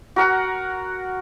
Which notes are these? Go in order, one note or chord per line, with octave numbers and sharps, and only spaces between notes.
F#4 A#4 F#5 A#5